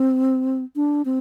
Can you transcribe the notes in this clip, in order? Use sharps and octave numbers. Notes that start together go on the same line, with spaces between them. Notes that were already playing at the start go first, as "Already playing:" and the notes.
Already playing: C4
D4
C4